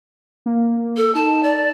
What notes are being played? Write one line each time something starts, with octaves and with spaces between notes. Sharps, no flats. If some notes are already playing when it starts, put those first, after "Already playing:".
A#3
A4
D#4 A5
D5